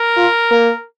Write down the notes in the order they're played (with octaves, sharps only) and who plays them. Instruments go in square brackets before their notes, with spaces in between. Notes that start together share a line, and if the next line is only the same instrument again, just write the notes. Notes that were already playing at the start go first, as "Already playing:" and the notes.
Already playing: [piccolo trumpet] A#4
[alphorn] F4
A#3